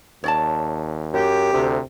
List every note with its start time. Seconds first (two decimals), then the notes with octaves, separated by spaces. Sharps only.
0.24 D#2 C#5 D5 A5
1.14 F#2 G4
1.53 D2 C3